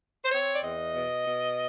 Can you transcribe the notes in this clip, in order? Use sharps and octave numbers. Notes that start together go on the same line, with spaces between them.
C5
C4 C#5
D5
E2 D#5
B2
B2